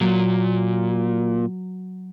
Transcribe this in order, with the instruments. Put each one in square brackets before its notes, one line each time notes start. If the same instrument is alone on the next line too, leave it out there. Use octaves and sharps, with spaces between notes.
[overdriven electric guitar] A#2 [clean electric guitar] F#3